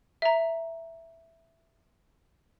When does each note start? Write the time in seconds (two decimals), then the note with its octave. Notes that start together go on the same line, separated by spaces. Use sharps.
0.22 E5 A#5